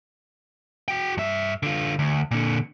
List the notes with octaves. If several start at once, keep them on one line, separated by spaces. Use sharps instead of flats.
F#4 G5
G2 E5
D3 F4
D2
A#2 D3